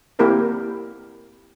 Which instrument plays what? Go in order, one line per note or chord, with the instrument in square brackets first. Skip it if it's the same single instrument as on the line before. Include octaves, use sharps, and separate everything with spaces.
[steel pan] A#3 C4 E4 G4 A#4 B4